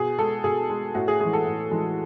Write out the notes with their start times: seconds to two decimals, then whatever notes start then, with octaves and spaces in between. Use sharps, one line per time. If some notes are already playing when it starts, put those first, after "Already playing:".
Already playing: B2 G#4
0.19 G#3 A4
0.44 B2 G#4
0.70 G#3
0.95 A2 F#4
1.08 G#4
1.20 E3 G#3 G#4
1.33 A4
1.46 A2
1.71 E3 G#3